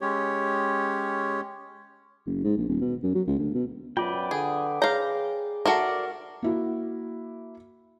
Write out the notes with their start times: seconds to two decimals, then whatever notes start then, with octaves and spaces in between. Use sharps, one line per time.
0.01 G#3 C#4 G4 C#5
2.26 F#1
2.44 G#2
2.57 A#1
2.69 D#1
2.81 B2
3.03 F#2
3.15 F#3
3.27 C#2
3.38 D2
3.54 B2
3.97 F#2 F4 B4 D5 G5
4.31 D3 G#4
4.82 G#4 C#5 F5 A#5
5.66 F#4 A4 A#4 D5 E5 F#5
6.42 A#3 E4 F#4